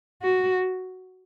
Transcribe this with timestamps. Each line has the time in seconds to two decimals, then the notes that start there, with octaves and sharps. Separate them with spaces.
0.22 F#4